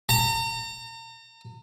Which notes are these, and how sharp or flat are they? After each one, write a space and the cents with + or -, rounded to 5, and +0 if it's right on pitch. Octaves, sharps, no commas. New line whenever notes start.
A#5 -40